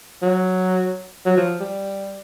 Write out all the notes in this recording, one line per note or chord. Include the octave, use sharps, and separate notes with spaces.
F#3
F#3
F3
G3